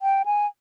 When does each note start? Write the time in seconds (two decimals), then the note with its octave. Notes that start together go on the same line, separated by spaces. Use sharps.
0.02 G5
0.26 G#5